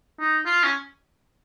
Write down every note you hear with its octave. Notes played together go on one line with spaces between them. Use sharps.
D#4
F4
C#4